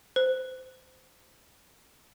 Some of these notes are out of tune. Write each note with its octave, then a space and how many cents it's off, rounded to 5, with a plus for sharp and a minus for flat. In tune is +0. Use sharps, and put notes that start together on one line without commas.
C5 -20